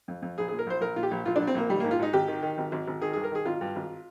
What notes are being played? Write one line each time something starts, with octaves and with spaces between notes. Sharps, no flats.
F2
F2
A#1 G#4
G#4
A#2
A#4
A#1 C5
A#1 A#4
A#2 F4
G4
A#1
A#1 F4
D4
A#1
C4
A#1 A#3
D#3 G3
A#3
G#2
F4
G#2 D#4
G#1 G4
D#3
D#3
G#1
G#1
G#1
D#3 G#4
G#4
G2
A#4
D#3 G#4
G#1 F4
G2
G#1